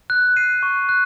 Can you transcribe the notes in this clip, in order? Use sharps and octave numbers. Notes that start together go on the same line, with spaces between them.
F#6
C7 D#7
C#6
F#6